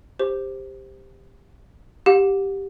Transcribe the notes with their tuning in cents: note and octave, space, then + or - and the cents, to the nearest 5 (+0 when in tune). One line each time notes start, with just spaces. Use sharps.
G4 +15 C5 +0
G4 +0 F#5 -35